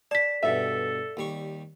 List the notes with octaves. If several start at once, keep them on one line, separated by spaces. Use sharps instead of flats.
D5 A5 B6
G2 B2 A4 E5
D#2 G3 C#6